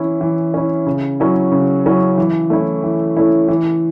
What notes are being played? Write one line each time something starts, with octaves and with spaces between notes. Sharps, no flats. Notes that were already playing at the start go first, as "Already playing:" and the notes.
Already playing: E3 C#4 E4
E3
C#4 E4
C#3
F#3 C#4 E4
C#3
F#3 C#4 E4
E3
A3 C#4 E4
E3
A3 C#4 E4
E3